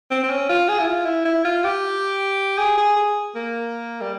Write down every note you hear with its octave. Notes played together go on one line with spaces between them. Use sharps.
C4
C4
C#4
F4
G#4
E4
F4
E4
E4
F4
G4
G#4
G#4
G#4
A#3
G3